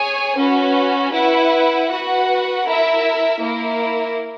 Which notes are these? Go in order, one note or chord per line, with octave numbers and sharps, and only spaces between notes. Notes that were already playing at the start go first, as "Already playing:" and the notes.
Already playing: G#4 C#5 G#5
C#4 F#4 B4
E4 B4 F#5
F#4 B4 F#5
E4 A#4 E5
A#3 E4 A#4